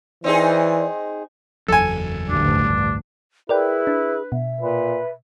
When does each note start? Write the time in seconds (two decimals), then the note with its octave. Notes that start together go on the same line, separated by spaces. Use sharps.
0.24 E3 C4 D#4 G#4 D5
1.68 F#1 E2 F#3 A4 G#5
2.29 A1 D2 G2 D4
3.49 E4 G#4 A#4 B4 D5 G5
3.87 D4
4.32 B2 E5
4.61 A#2 B4